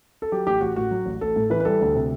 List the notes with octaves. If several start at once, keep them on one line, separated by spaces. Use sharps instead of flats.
A4
F#3 G4
A1 G4
A1 F#4
A2 F#4
F#3
A1
A1 A4
A2
E3 B4
B4
G3 A4
D2
C3